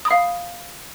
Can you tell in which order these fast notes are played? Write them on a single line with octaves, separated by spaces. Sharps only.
D#6 B5 F5